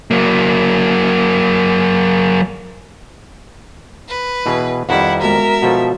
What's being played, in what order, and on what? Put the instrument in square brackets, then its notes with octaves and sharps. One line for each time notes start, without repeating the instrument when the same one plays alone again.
[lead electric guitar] F#3 A#3
[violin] B4
[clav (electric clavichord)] B2 E3 G#4
[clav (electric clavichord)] F2 D#3 G3 [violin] E4 [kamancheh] F#5
[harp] G#3 B3 F#4 [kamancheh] A#4 [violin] E5
[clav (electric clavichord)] B2 F3 A4 [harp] F#4